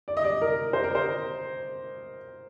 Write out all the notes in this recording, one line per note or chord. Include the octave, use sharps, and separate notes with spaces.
D5
D#5
D5
A#4
C5
A#4
C5